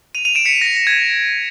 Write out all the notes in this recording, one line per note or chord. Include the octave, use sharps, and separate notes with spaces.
D#7 F7
D#7 F7
D7 E7
B6 C#7
A#6
A#6
G#6
A#6